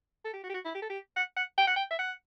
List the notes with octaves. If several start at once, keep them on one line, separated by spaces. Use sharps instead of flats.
A4
G4
F#4
G4
F#4
E4
G4
A4
G4
F#5
F#5
G5
F#5
G5
E5
F#5